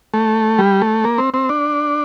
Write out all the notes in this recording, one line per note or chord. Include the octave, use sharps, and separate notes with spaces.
A3
G3
A3
A#3
C4
C4
D4